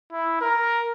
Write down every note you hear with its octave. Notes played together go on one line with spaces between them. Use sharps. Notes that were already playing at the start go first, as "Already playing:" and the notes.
E4
A#4